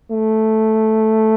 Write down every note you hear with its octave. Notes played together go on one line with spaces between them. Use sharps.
A3